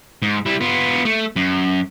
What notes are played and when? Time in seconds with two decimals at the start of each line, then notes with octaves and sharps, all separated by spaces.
0.22 G#2
0.46 G3 E4
0.61 B3 F4
1.05 A3
1.36 F#2